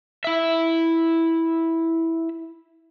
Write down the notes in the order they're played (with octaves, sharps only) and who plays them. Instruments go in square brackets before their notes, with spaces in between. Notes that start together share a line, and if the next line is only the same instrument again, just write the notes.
[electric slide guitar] E4 E5